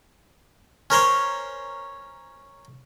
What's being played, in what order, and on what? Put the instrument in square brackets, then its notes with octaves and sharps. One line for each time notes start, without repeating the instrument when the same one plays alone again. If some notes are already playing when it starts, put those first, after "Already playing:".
[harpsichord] C#4 A#4 C5 C#5